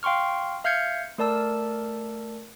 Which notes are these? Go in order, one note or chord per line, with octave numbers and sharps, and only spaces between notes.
F5 G5 C6 C#6 F6
E5 F5 F6 G6 G#6 C#7
A3 A#4 D5 A5 E6